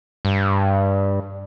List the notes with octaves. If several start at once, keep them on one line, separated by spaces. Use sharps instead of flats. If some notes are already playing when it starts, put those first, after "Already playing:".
G2